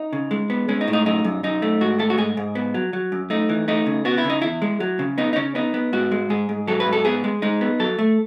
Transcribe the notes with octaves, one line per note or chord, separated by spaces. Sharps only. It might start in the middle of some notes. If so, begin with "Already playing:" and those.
Already playing: D#4
C#3
G#3
B3
G#3 C#4
D#4
A2
D#4
F#2 D#4
F#2
F#2 D#4
A3
G#2 F#4
A3 A4
F#4
G#2 G#4
G#2
B3
F#3
F#3
F#2
A3 D#4
E3
A3 D#4
C#3
B3 F#4
E4
C#3
D#4
E2 E4
G#3
F#3
C#3
B3 D#4
D#4
C#3 C#4
B3 D#4
B3
G#2 F#4
G#3
G#2 G#4
G#2
F#3 A4
B4
G#2
A4
B3 G#4
G#3
G#3 D#4
B3
F#3 A4
A3